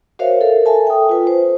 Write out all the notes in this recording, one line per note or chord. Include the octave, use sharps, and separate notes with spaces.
F#4 A#4 C5 C#5 E5 F5
A4 A#4
A4 E5 G#5 A5
G5 D#6
F4 B4
C5